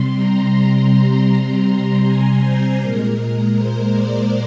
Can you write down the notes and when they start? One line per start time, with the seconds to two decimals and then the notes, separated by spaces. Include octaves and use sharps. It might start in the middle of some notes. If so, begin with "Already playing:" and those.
Already playing: C3 G3 C6
0.17 A#5
1.30 C6
1.68 C6
2.05 G#5
2.44 C5
2.81 A#2 G#3 A#4
3.57 C5
3.95 D5